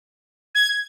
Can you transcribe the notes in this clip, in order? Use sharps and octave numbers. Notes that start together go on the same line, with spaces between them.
G#6